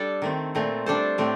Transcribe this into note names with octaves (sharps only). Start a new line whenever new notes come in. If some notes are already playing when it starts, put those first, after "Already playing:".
Already playing: G3 D4 A4
D#3 A3 C4
A#2 A3 C4 F4
G3 D4 A4 C5
A2 A3 C4 G4